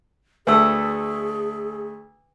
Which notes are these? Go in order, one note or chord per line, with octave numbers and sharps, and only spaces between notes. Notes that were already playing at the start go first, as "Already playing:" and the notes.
D2 A3 G#4 A4 B4 E6